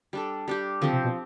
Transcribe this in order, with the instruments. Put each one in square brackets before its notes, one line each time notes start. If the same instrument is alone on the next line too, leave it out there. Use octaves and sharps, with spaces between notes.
[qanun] G3 D4 A4
G3 D4 G4
[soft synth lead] D3 [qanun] F3 C4 G4
[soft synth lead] C3
B2